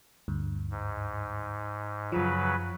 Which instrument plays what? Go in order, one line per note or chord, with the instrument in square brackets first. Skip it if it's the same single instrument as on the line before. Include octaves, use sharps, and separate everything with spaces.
[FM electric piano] D2 G2
[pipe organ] G#2
[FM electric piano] F#2 F3 [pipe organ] C#3 F#3 B4